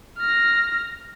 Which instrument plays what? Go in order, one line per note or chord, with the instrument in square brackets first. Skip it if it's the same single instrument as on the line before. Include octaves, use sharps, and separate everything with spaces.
[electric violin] F6 A#6